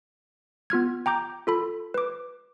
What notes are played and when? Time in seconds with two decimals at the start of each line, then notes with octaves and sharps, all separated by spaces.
0.70 B3 F4 F6 G#6
1.06 G5 A#5 D6 G6
1.47 F4 A4 B5
1.94 B4 D6